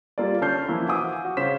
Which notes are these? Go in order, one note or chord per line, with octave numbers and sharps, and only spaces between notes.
G3 A#3 F4 A4 D5
D3 C#4 A5 F6 G6 C7
E3 F3 A#3 E4
F#4 F5 G#5 D6 D#6
F#4
C#3 C#4 C5 B6 E7